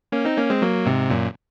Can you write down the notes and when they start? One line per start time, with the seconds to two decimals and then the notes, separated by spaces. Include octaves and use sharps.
0.12 A#3 C#4
0.25 C4 D#4
0.38 A#3 C#4
0.50 G#3 C4
0.62 F#3 A#3
0.86 G#2 C3
1.10 F#2 A#2